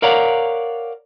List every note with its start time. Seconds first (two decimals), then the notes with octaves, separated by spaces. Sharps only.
0.02 A#4 C#5 D5 F5 F#5 A#5